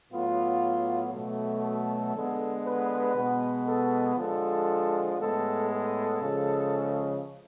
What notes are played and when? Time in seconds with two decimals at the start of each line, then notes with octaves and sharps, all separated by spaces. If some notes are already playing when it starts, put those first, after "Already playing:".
0.11 A2 F#3 B3 F4
1.13 B2 F#3 A3
1.63 A4
2.14 D3 G#3 B3
2.65 B4
3.15 B2 G#3 B3
3.67 A4
4.17 D3 F3 G#3 A4
5.18 A2 G#3 B3 A4
5.69 A4
6.20 C#3 F3 G#3